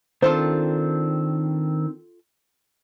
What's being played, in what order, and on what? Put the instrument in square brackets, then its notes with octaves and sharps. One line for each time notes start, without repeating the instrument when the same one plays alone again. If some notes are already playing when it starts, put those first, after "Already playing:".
[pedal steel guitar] D#3 C4 D4 [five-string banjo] F4 A4 C5